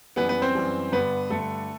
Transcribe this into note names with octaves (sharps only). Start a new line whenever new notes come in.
F#2 E3 G3 B3 B4
B3 B4
C4 C5
F#2 E3 G3
G2 D3 G3 B3 B4
G2 D3 G3 A3 A4